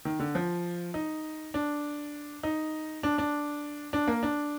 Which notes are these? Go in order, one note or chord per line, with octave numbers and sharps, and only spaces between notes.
D#3
D3
F3
D#4
D4
D#4
D4
D4
D4
A#3
D4